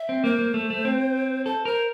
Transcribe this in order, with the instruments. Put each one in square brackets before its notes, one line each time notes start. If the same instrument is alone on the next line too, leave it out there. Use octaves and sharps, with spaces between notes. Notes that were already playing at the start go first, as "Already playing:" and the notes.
Already playing: [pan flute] E5
[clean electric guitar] C4
[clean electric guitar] A#3 [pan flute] C5
[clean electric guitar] A#3
A3
A3
C4
[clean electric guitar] A4 [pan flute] C5
[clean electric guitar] A#4 [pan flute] C5